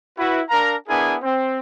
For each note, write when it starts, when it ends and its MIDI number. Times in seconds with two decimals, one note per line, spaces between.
0.17 0.41 64
0.17 0.41 66
0.17 0.41 71
0.49 0.74 62
0.49 0.74 70
0.49 0.74 77
0.49 0.74 82
0.88 1.15 59
0.88 1.15 62
0.88 1.15 64
0.88 1.15 68
0.88 1.15 70
0.88 1.15 80
1.21 1.59 60
1.21 1.59 72